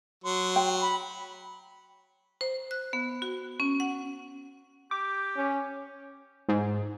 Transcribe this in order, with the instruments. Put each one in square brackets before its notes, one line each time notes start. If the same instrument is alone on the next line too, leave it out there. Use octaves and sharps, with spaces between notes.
[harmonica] F#3 [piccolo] C6
[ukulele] G5
[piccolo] B5
[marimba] C5
F#6
B3
F#4
C#4
F#5
[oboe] G4 [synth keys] D6
[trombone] C#4
[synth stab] G#2